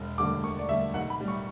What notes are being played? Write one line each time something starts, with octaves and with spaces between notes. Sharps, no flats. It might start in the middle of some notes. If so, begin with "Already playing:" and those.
Already playing: E1
D2 D3 G3 D6
E1 C#6
D5
D2 D3 G3 E5
B1 F#5
B5
A2 G3
C#6